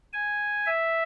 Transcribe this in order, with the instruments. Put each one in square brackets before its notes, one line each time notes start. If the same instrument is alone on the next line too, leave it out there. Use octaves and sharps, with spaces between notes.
[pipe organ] G#5
E5